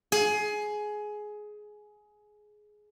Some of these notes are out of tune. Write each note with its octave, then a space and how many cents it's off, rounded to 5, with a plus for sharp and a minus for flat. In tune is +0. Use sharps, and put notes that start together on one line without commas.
G#4 +15